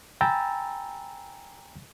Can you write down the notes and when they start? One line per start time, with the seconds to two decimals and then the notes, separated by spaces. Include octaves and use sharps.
0.21 G5 G#5 A#5 B5 E6 A6